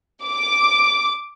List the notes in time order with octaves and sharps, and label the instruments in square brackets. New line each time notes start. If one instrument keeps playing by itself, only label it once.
[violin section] D6